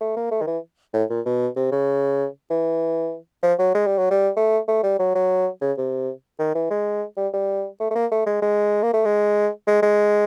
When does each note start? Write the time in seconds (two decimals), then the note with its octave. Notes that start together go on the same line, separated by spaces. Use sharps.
0.01 A3
0.17 A#3
0.31 A3
0.42 D#3
0.47 E3
0.93 A2
1.10 A#2
1.26 B2
1.56 C3
1.72 C#3
2.50 E3
3.43 F3
3.59 F#3
3.75 G#3
3.87 G3
3.98 F#3
4.11 G3
4.37 A3
4.68 A3
4.83 G3
4.99 F#3
5.15 F#3
5.61 C#3
5.77 C3
6.39 D#3
6.55 E3
6.70 G#3
7.17 G3
7.33 G3
7.80 A3
7.91 A3
7.95 A#3
8.12 A3
8.26 G#3
8.42 G#3
8.83 A#3
8.94 A3
9.05 G#3
9.67 G#3
9.83 G#3